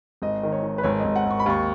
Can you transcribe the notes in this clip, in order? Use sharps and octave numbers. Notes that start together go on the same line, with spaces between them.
G#1 D#5
D#3
C#5
D#3
B4
G#1 C#5
D#5
G#1
F#5
G#1
C#6
B5
D#2 C#6